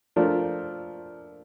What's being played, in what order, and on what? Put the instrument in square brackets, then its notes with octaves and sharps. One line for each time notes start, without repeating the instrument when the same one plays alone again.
[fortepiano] F3 A3 D4 F4 A#4